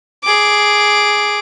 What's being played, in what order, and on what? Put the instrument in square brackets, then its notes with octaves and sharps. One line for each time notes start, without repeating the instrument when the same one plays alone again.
[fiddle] G#4 D6